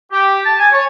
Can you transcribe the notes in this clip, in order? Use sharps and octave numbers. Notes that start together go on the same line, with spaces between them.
G4
A5
G#5
C#5